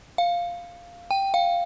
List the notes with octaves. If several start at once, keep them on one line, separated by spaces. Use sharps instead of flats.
F5
G5
F5